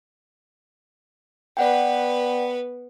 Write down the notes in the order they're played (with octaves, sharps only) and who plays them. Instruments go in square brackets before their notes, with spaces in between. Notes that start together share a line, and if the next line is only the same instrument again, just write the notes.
[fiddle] B3 B4 [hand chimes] D5 F#5 G5